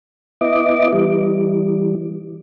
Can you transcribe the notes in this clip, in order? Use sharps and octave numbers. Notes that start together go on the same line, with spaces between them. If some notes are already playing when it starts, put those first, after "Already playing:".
B3 E4 D#5 D6
E3 G3